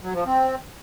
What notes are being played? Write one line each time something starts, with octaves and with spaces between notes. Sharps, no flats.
F#3
F3
C4